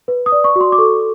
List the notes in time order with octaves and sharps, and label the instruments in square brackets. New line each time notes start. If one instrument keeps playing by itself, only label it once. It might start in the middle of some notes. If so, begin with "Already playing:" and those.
[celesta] B4
D#6
D5
C#6
F#4
C6
D6
A4 C#6